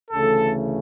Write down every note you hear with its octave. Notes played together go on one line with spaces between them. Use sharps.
D2 C#3 E3 A3 A4